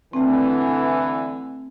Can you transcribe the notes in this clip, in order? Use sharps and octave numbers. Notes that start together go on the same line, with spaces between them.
D3 E3 A3 C4